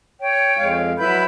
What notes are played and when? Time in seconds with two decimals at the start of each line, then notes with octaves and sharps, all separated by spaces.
0.20 C#5 G5
0.57 F2 G#3 F5
0.99 F#3 E4 B4 B5 G6